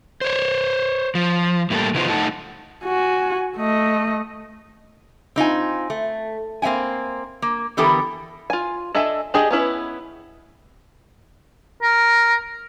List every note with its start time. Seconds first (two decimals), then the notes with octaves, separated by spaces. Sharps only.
0.21 C5 C#5
1.15 F3
1.70 A2 G3 A#3 A4
1.94 C#3 E3 B3 D#4 F4 C5
2.09 A3 D#4 F#5 A5
2.84 F#4 G#5
3.57 A3 D#5
5.36 C4 D#4 F4 G#5
5.90 A3
6.62 A#3 C4 E5 G5 G#5
7.42 A#3
7.77 D3 E3 B3 G4 A4 A#4
8.50 F4 G#5
8.95 D4 A4 D#5 E5 G#5
9.34 D4 G4 G#4 D#5
9.51 B3 C#4 E4 B4
11.82 A#4